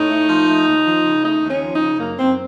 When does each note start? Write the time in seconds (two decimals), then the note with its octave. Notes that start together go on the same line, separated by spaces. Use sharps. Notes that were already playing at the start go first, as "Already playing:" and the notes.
Already playing: A2 D#4
0.10 A3
0.29 F3
0.48 A3
0.67 D#2
0.86 F3
1.05 C#3
1.24 A3 D#4
1.43 D#2
1.50 C#4
1.62 F3
1.74 D#4
1.81 C#3
1.99 F#2 A#3
2.19 F#2 C4